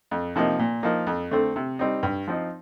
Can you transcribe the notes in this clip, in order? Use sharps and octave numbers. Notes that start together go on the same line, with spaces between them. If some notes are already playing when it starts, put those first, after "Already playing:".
F2
C3 F3 A#3 D#4
A#2
F3 A#3 D#4
F2
D3 A3 C4
C3
G3 C4 D#4
G2
F3 C4 D#4